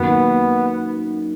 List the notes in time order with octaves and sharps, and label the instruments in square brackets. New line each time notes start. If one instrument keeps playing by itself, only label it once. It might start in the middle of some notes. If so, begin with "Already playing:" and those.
Already playing: [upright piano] F#2 D#3 A#3 D#4 [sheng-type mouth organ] B3